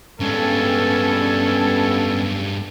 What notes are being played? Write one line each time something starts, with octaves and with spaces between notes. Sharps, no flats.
G2 G3 G#3 B3 C#4 A4